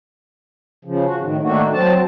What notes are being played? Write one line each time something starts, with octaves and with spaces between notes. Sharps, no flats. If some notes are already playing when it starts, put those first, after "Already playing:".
C#3 F3
F#4
A2 D#3
D#3 A3 A#3 D4 F#4
F#3 C4 A5